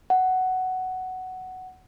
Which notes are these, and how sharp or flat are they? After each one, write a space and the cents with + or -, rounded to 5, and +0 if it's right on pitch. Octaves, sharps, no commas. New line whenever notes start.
F#5 +10